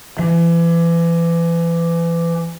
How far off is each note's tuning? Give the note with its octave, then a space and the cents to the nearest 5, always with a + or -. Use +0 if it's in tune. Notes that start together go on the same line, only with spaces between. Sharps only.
E3 +35